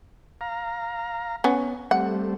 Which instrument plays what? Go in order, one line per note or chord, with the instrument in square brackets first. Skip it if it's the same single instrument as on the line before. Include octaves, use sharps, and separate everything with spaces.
[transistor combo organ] F5 A#5
[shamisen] B3 C#4
[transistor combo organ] G3 A3 C4 [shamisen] F#5